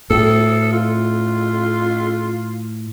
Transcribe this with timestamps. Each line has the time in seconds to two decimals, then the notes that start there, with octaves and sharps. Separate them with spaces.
0.10 A2 A4
0.73 F4